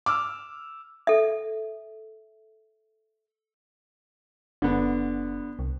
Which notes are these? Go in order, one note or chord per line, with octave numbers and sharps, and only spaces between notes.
D6 E6 F6
A4 E5
F#1 D3 B3
C2